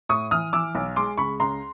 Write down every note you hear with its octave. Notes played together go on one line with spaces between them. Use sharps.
A2 C#6 D#6
E3 D#6 F6
E3 D6 E6
B1
G#3 C6 D6
C#2 B5 C#6
C#2 A#5 C6